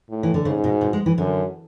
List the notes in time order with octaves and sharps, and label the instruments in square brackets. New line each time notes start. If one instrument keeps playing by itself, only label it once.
[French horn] A2
[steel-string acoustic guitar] E3
D3
[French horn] G#2 [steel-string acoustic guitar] C#3
[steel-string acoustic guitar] B2
B2
G#3
E3
[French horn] F#2 [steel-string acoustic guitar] D3